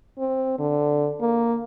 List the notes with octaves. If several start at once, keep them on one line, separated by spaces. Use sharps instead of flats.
C4
D3
A#3